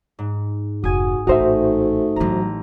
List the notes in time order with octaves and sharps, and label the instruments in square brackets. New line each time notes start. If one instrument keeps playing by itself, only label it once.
[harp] G#2
[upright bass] F1 [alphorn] F#4 [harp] G#5 D#6
[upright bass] A1 A2 [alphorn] A3 [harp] D#4 [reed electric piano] F#4 C5 E5
[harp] A1 A#5 [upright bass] F#3 G3